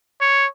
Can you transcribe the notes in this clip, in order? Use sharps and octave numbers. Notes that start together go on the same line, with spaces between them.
C#5